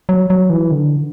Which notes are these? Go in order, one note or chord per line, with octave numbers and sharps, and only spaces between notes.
F#3
F#3
E3
D3